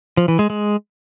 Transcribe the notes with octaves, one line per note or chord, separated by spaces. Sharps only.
F3
E3
G#3
G#3